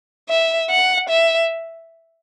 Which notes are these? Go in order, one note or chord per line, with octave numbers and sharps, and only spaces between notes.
E5
F#5
E5